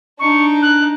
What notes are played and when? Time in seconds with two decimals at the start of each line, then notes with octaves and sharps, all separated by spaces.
0.19 D4 D#4 C#6
0.62 F#6